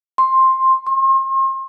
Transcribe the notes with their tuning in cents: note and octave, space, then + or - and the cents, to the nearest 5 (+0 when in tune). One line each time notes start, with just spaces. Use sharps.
C6 +10
C6 +40